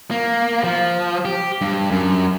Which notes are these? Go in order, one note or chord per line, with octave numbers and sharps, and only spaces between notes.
A#3
F3
G4
G2
F#2